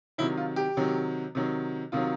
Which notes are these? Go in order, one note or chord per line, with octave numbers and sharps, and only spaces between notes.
C3 D#3 F#3 E4
F4
G4
C3 D#3 F#3
C3 D#3 F#3
C3 D#3 F#3 F4